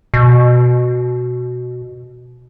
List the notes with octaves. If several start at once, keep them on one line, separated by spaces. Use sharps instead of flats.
B2